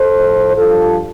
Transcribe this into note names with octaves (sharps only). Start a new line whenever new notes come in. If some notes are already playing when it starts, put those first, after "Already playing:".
Already playing: A4 C5
A2 F3
G2 F3 F4 A4